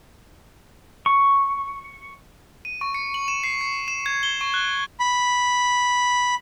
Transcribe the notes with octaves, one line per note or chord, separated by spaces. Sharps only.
C#6
D#7
C#6
C#7
F#7
E7
C7
C#7
E7
G#6
G7
C#6
F#6
B5